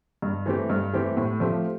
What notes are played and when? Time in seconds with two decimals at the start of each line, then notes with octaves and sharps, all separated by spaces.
0.22 G2
0.46 E3 A3 C4 G4
0.70 G2
0.93 E3 A3 C4 G4
1.17 A2
1.40 F3 A3 C4 G4